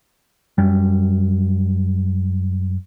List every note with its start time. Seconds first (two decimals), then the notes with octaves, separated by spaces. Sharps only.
0.58 F#2 G3